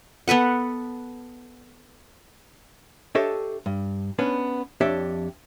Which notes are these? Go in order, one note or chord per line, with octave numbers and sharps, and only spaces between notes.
B3 A4 B4 F#5
D4 G4 A4 C#5 D#5 E5
G2
B3 C#4 D4 B4
F2 D4 G4 C#5 E5